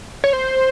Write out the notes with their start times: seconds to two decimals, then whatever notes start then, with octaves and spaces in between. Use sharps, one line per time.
0.24 C#5
0.33 C5